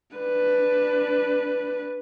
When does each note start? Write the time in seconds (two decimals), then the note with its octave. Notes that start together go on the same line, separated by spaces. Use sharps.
0.17 D4 B4